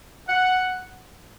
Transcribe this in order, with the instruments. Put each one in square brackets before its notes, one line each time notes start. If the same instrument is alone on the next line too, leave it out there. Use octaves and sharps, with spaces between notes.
[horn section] F#5